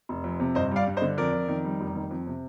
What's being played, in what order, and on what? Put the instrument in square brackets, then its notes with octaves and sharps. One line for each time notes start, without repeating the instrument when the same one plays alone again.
[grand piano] F1
F2
C3
G1 C5 D#5
G3 D5 F5
G2
C5 D#5
D3
F2 A#4 D5
F2
D#3
G3
F1
D#3
F2
C3